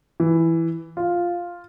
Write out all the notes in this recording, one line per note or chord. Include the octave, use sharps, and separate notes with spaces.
E3
F4